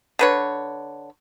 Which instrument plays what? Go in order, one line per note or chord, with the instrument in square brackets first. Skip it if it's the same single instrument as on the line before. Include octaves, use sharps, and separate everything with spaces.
[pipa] D3 B4 C#5